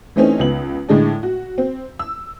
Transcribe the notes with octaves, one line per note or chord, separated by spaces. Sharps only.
E3 A3 C4 C#4 D#4
C#2 B3 F#7
A2 D3 G#3 D4
F#4
C4
E6